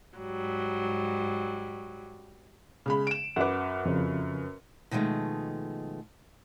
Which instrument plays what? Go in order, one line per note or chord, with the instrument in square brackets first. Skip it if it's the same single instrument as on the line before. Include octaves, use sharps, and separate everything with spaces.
[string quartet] G#2 F#3 G3
[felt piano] C#3 G#3 B5
D7 E7
[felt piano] F#2 B4 [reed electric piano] F#5 D6
[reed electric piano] F2 C#3
[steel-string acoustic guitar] B2 D#3 F3 G#3 A3